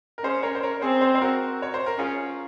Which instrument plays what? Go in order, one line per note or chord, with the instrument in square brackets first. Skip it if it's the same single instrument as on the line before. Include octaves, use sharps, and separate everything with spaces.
[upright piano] A#4
[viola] C#4 [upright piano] G#4 C5
[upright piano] A#4 C#5
C5
A#4 C#5
[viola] C4 [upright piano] G#4 C5
[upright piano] G#4 C5
C5
F#4 A#4
C#5
C5
A#4
[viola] C#4 [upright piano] F4 G#4